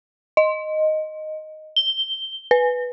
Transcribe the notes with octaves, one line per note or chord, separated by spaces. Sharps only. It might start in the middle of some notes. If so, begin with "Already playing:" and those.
D#5
G7
B4